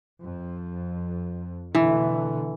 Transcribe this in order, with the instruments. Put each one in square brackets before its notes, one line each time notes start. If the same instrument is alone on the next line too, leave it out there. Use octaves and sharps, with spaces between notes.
[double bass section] F2
[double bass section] B2 D3 A3 [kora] E3